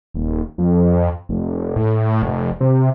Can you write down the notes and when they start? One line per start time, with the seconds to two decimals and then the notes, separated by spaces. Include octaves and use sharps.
0.14 D#1
0.58 F2
1.29 F1
1.76 A2
2.22 F1
2.61 C3